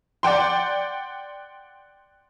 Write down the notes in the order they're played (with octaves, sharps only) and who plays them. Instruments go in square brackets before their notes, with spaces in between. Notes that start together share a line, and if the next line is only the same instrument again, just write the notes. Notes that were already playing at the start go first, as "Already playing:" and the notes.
[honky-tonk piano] D5 F#5 G5 C6